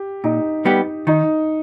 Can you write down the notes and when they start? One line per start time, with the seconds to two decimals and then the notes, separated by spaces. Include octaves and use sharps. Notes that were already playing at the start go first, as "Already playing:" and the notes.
Already playing: G4
0.24 A#2 D#4
0.65 G3 B3 G4
1.07 D#3 D#4